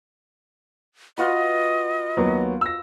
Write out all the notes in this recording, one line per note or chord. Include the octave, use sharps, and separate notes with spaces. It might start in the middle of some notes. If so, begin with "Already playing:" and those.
F4 F#4 B4 D#5
D#2 F#3 B3
E6 A#6